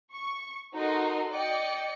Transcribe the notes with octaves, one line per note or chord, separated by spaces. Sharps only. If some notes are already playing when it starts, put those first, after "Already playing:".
C#6
D#4 F#4 A4 A#4 D#5 C6
D5 D#5 G5 C#7